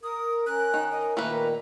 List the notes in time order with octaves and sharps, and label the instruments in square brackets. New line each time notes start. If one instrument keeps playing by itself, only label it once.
[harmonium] A#4 [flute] D#6
[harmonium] C#4 A#4 [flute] F#6
[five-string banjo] D#3
[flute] D#5
[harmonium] A#2 D#3 [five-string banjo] A3 A#3 B4 [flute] A#5